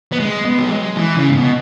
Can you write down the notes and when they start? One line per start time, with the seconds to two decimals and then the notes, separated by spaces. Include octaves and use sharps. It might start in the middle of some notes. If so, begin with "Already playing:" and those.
0.12 B3
0.20 G#3
0.45 B3
0.59 F#3
0.70 G#3
0.97 E3
1.16 C#3
1.29 G#2
1.35 B2